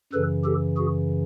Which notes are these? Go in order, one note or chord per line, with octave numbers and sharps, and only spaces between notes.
F#2 C#3 E3 A4 B4
G4 A4
F#4 G#4